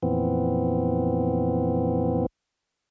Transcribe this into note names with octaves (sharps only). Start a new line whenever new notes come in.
F2 A#2 E3 B3 C4